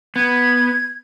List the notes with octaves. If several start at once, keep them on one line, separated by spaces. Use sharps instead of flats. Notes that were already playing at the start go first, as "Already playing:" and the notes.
B3 G#6